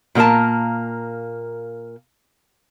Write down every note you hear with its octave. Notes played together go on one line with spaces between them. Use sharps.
A#2 F3 A#3 A#4 A5